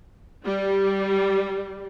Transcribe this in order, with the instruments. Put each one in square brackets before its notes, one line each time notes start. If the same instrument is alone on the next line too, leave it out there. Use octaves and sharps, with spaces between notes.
[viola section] G3